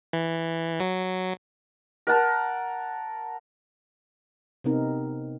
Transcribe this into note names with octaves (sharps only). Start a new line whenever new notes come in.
E3
F#3
A#4 F#5 A5
C3 B3 C4 D#4 A#4